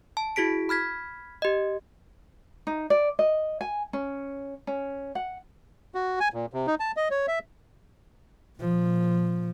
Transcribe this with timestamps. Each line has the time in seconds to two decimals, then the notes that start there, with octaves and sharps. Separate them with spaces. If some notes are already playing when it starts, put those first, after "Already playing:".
0.17 A5
0.36 E4 F#4 G#4 B6 D7
0.69 B5 F6 G#6 B6
1.42 G4 D#5
2.67 D#4
2.90 D5
3.19 D#5
3.61 G#5
3.93 C#4
4.67 C#4
5.15 F#5
5.95 F#4
6.20 G#5
6.34 A#2
6.53 C3
6.67 D#4
6.80 A5
6.97 D#5
7.11 C#5
7.28 E5
8.59 A#2 F3